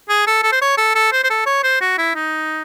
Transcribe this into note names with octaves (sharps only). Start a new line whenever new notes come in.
G#4
A4
A4
C5
C#5
A4
A4
C5
C5
A4
C#5
C5
F#4
E4
D#4